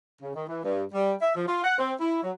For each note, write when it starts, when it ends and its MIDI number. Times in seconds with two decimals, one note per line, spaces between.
0.21 0.31 49
0.34 0.43 51
0.47 0.63 52
0.63 0.83 43
0.93 1.13 55
1.21 1.31 76
1.35 1.45 53
1.47 1.63 65
1.63 1.77 78
1.78 1.92 60
1.99 2.19 64
2.22 2.30 54